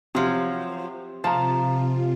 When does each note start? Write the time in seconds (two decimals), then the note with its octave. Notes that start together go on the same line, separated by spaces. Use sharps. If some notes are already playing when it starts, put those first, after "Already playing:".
0.15 C3 F3 F#3
1.24 C3 F3 F4 F5 A5 A#5